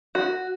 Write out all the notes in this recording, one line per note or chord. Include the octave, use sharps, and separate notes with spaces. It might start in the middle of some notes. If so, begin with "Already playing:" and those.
F#4